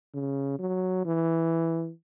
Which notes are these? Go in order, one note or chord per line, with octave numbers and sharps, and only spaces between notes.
C#3
F#3
E3